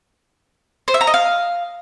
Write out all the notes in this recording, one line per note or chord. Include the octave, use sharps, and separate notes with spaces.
C5
E5
A#5
D#5
F5